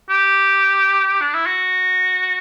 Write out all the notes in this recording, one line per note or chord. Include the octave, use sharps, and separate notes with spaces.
G4
D4
E4
F#4